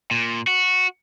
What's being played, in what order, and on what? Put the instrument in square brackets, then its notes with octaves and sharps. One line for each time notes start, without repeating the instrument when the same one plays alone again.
[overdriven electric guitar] A#2
F#4